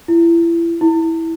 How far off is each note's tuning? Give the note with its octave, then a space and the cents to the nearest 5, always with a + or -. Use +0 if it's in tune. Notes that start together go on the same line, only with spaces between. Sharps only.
E4 +30
E4 -10